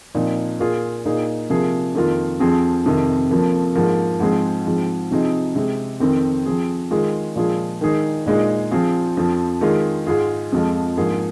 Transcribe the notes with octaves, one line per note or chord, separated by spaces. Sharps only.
A#2 F3 C4 D#4
A#2 A#3 F4 G#4
A#2 A#3 D#4 G#4
C3 F3 A#3 G#4
F2 D#3 A#3 F4
F2 F3 C4 G#4
F2 C3 D#3
F2 F3 A#3
G#2 F3 A#3
G#2 F3 G#3 C4 G#4
G#2 F3 C4
C3 F3 C4 D#4 G#4
C3 G#3 C4 G#4
F2 D#3 C4
F3 C4 G#4
D#3 G#3 F4 G#4
A#2 F3 G#3 F4 G#4
D#3 G#3 D#4 G#4
A#2 G#3 D#4 G#4
F3 C4 F4 G#4
F2 F3 C4
D#3 G#3 F4 G#4
G#2 G#3 F4 G#4
F2 F3 G#3 F4
G#2 F3 A#3 G#4